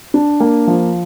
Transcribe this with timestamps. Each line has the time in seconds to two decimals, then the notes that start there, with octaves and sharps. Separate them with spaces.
0.14 D4
0.40 A#3
0.67 F3